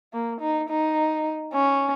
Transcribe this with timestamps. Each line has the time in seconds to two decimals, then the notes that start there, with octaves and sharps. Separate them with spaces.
0.13 A#3
0.41 D#4
0.70 D#4
1.54 C#4